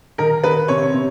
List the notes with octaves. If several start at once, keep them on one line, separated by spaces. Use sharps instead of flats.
D#3 A#4
D#3 B4
C3 C#5
C3